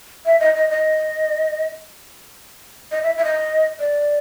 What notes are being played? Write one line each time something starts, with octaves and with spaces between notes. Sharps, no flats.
E5
D#5
D#5
D#5
D#5
E5
E5
D#5
D5